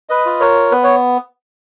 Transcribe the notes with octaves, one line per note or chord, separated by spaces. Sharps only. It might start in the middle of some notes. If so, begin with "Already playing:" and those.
B4 D#5
F4
A#4 C#5
B3 B4
C#5